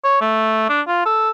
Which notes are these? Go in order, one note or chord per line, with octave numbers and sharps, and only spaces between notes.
C#5
A3
D4
F4
A4